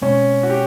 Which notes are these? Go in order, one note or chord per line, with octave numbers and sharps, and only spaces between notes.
B2 G#3 C4 C#4
F#4
G4